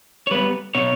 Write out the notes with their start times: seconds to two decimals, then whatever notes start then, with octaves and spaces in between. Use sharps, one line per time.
0.27 C#5
0.31 G3 B3 B4
0.75 B2 C#5